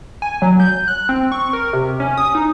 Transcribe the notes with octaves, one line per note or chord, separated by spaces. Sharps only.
G#5
F#3
G6
F#6
C4
C#6
A#4
C3
C#4
D#6
D#4